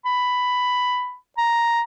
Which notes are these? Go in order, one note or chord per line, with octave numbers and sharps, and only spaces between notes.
B5
A#5